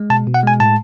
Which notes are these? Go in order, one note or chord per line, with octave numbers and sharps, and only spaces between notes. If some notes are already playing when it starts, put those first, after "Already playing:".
Already playing: G#3
B2 A5
B2
F#5
G#3 G#5
A2 A5